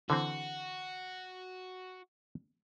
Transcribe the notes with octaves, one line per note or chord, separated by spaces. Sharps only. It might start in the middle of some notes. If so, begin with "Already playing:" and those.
D3 E3 C4 F#4